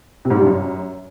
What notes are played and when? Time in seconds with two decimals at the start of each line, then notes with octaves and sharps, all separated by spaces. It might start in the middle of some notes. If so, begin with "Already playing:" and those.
0.25 C3
0.30 G#2
0.36 G3
0.41 G2
0.47 F#2